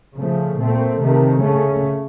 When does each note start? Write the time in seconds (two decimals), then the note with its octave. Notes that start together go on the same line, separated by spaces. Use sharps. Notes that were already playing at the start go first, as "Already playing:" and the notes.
0.16 C#3 F3 A3
0.57 A#2 A3 C4
0.98 C3 D#3 A3
1.39 C#3 A3 C#4